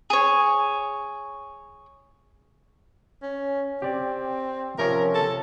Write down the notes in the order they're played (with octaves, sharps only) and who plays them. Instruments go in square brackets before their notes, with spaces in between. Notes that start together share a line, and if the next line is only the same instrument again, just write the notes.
[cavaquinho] G#4 C#5
[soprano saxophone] C#4
[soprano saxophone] C4 [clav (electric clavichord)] G4 D5
[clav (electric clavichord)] C3 F3 C#4 [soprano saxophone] A#4
[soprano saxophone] A4